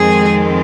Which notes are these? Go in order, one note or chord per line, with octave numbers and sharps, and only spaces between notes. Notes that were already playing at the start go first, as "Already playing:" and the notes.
Already playing: F2 D#3 G#3 C4 G#4